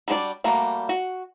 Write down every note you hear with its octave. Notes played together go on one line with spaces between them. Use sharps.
G3 D4 F#4 C#5 D5
G3 A3 A#3 F#4
F#4